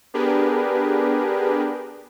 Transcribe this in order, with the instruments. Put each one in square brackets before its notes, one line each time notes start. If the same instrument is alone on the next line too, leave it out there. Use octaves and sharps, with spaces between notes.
[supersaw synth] B3 D4 G4 G#4 A#4 B4